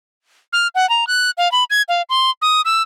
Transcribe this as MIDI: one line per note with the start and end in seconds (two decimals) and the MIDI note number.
0.53 0.68 89
0.75 0.89 78
0.89 1.07 82
1.07 1.31 90
1.38 1.51 77
1.52 1.64 83
1.70 1.82 92
1.88 2.02 77
2.09 2.31 84
2.42 2.62 87
2.65 2.82 88